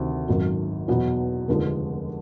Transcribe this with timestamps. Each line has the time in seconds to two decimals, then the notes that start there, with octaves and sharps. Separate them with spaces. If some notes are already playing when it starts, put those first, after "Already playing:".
Already playing: D2 C3 D#3
0.28 G#1 F#2 D#3 F#3
0.88 E2 B2 F#3 B3
1.48 F1 D#2 D3 F3 G#3